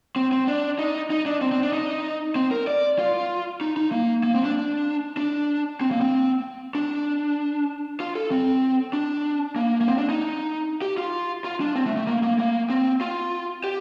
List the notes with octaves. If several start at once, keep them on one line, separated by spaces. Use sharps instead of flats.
C4
C4
D4
D#4
D#4
D4
C4
C4
D4
D#4
C4
A#4
D5
F4
D#4
D#4
A#3
A#3
C4
D4
D4
C4
A#3
C4
D4
F4
A4
C4
D4
A#3
A#3
C4
D4
D#4
G4
F4
F4
D4
C4
A3
A3
A#3
A#3
A#3
C4
F4
G4